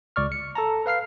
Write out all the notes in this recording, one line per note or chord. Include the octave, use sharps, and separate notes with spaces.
C#2 D5 C#6 F6
C#7
A4 A5 A#5
B4 F5 F6 C7